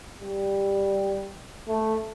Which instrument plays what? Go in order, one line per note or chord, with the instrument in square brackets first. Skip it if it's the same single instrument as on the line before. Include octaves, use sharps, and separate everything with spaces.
[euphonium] G3
A3